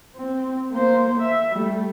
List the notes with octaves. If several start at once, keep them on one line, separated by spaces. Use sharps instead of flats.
C4
A#3 C5
E5
G3 A3